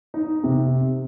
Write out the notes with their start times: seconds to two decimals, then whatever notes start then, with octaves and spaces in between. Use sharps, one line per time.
0.14 D#4
0.43 C3